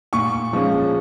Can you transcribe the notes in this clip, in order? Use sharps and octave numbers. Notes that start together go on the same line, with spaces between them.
A#2 C#6
F3 G#3 C#4